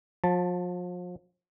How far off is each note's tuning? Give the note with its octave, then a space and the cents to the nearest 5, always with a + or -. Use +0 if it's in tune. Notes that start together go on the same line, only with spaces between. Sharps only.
F3 +40 A5 +0